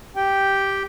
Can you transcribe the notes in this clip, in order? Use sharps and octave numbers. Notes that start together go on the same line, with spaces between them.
G4 G5